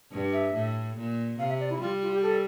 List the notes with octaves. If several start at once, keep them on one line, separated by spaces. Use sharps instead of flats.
G2
E5
A2
A#2
C3 F5
E5
D5
E4
G3 F4
F4
G4
A4